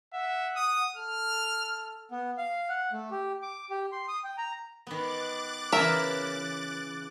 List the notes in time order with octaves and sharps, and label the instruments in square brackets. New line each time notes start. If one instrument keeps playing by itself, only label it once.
[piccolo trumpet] E5 [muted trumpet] F#5
[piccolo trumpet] D#6
[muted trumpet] A4 [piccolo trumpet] F6
[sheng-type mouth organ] B3
F5
F#5
A3
G4
D6
G4
C6
D#6
G5
A#5
[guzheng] D#3 B3 [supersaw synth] D6 F#6 A6
[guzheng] C#3 E3 [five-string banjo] A#4 [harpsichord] E5